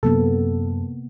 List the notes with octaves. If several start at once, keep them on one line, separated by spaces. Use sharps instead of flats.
F#2 C3 A#3 B3 A4